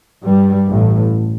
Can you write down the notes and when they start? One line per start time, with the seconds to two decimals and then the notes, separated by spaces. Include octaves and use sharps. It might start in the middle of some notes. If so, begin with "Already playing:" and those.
0.24 G2 G3
0.68 A1 A2